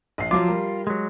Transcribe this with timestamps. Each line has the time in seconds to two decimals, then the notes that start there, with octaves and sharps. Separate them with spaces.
0.18 A#1 C7
0.31 F3 F#3 F4 D6
0.48 G3 A#4
0.87 F#3 G#3